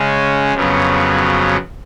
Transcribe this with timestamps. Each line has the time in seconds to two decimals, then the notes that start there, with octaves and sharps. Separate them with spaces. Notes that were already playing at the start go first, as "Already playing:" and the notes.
Already playing: C#3 G#3 C#4
0.54 F2 C#3 F#3 B3